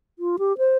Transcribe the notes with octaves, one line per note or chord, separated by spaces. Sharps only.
F4
G4
C5